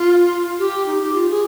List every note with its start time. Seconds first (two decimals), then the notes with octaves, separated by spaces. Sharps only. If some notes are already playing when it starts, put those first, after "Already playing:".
Already playing: F4
0.59 G4
0.87 D#4
1.02 G4
1.14 F4
1.30 G#4